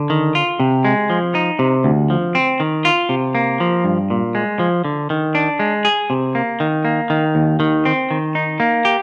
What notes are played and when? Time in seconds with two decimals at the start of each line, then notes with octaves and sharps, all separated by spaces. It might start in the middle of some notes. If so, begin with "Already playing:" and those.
Already playing: D3
0.10 D#3
0.35 F4
0.60 C3
0.85 G#3
1.10 F3
1.35 D#4
1.59 C3
1.84 D2
2.10 F3
2.35 C4
2.60 D#3
2.85 F4
3.09 C3
3.35 A#3
3.60 F3
3.85 G2
4.10 A#2
4.35 G#3
4.59 F3
4.85 D3
5.10 D#3
5.35 D4
5.59 G#3
5.85 G#4
6.10 C3
6.35 A#3
6.60 D#3
6.85 A#3
7.10 D#3
7.35 D#2
7.60 D#3
7.85 C4
8.11 D#3
8.35 D#4
8.60 A#3
8.85 G4